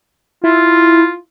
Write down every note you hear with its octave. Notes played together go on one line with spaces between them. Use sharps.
E4 F4